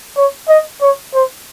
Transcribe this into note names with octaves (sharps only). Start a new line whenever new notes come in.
C#5
D#5
C#5
C5